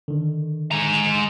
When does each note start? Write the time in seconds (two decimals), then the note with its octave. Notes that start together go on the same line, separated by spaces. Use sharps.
0.08 D3 D#3
0.71 G#3 A#5